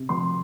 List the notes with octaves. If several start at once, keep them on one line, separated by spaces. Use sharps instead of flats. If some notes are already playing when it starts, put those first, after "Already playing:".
Already playing: C3
F3 C6